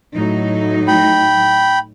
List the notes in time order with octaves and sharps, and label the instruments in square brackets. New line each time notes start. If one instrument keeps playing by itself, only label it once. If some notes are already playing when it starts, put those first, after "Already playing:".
[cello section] A2 F#3 D#4
[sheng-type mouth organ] G5 B5